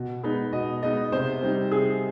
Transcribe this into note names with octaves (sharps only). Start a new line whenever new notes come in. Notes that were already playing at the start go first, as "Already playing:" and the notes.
Already playing: B2
G#3 B3 D#4
B2 D#5
G#3 B3 D#4 D#5
C3 C5
G3 C4 D#4
C3 G#4